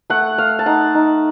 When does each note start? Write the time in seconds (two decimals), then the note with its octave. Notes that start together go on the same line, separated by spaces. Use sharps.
0.10 A3 F#5
0.38 A3 F5
0.59 A5
0.66 D#4 F#5
0.95 D#4